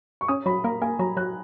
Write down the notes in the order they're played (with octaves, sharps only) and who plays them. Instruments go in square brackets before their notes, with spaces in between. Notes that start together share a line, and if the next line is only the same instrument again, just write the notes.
[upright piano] C#6
[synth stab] C#4 [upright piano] D#6
[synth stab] F#3 [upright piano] B5
[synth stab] A#3 [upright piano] A#5
[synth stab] A#3 [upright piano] G#5
[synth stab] F#3 [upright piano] A#5
[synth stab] F#3 [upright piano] F#6